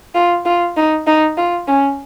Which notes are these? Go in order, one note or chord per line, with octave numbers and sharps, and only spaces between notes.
F4
F4
D#4
D#4
F4
C#4